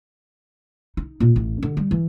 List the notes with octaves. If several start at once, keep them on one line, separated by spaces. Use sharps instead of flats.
D#4
A#2
A1
D3
G3
E3